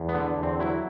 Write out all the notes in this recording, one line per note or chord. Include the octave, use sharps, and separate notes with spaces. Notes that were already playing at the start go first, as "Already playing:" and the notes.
Already playing: E2
B3
D3
E2
C4
F#3 E4